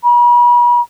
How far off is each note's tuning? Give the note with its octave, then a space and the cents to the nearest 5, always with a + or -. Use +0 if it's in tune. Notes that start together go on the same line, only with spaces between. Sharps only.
B5 -40